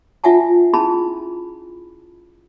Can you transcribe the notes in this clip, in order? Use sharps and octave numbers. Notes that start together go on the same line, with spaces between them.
D4 F4 E5 F#5 G#5 A5
C#4 E4 G#4 A5 B5